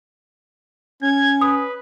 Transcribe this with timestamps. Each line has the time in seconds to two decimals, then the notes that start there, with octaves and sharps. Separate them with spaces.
1.02 C#4 G#6
1.41 B4 D#6